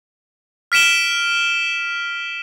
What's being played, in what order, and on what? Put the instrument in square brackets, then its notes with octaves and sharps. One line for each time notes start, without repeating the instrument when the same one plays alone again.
[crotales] F6 B6 D7 E7 G7